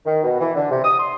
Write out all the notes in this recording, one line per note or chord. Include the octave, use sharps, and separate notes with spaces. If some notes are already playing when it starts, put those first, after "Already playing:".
D#3
B2
E3
D3
C3
D#6
C6